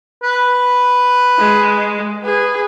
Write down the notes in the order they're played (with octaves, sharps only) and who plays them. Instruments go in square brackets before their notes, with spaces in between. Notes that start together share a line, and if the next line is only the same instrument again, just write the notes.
[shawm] B4
[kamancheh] G#3
G#4 B4